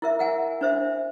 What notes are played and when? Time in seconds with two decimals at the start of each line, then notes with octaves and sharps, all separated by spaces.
0.02 E4 A#4 E5
0.19 A#4 F#5 G#5
0.61 D4 C5 E5